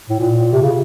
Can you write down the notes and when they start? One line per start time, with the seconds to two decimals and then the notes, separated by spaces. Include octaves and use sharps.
0.09 A2
0.20 A#2
0.53 C3
0.62 C#3